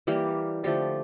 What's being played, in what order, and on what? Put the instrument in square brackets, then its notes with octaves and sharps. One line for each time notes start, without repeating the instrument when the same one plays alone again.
[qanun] E3 G3 A#3 G4
D3 F3 A3 G4